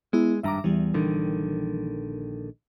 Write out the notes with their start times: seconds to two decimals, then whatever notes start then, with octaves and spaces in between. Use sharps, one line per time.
0.13 G#3 B3 E4
0.43 G#1 G2 E5 A#5 D6
0.64 E2 E3 G3
0.94 A#1 D3 D#3